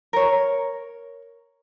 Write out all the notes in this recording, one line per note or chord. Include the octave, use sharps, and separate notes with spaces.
A#4 C#5